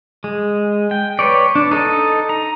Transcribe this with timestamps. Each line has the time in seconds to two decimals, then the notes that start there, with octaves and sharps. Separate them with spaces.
0.24 G#3
0.91 G5
1.19 B4 C#5 D5
1.55 D4
1.71 D#4 A4 D#5
2.29 A#5